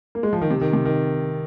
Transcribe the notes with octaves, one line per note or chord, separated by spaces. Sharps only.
A#3
G#3
F3
D#3
C3
D#3
C3
D#3